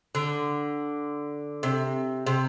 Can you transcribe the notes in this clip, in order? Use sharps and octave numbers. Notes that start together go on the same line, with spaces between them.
D3
C3
C3